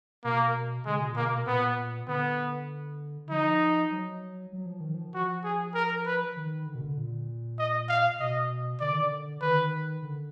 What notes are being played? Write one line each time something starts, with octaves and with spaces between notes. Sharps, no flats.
B2 A#3
D3 G#3
B2
A#2
A#3
B2
A#2 B3
D3 B3
F3 D#4
F#3
F#3
F3
D#3
F3
F3 F#4
G#4
A#4
B4
D#3
D3
B2
D3
A#2
D#5
F5
B2 D#5
D3 D5
D#3
D3
D#3 B4
D3